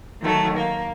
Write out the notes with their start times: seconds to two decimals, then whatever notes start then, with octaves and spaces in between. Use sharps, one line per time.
0.20 D#3 F#3 A3
0.56 A#3